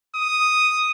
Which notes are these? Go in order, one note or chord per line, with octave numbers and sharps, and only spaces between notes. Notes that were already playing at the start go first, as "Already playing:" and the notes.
D#6